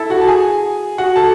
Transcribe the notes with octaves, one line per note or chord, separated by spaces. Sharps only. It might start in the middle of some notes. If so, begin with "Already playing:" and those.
Already playing: E4 A4 E5 A5
F#4 F#5
A5
G#4 G#5
F#4 F#5
A4 A5